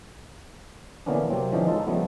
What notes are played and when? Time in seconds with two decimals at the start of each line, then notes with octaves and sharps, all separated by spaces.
1.06 D3 E3 A#3 B3 C#4 D4
1.30 C3 F#3 A#3 C4
1.51 D3 E3 F3 C#4 D#4 G4
1.66 G#3 D#4 F4 A4
1.87 C#3 F3 G3 A3 B3